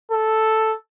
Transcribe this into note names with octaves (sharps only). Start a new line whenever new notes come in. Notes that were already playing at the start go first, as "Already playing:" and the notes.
A4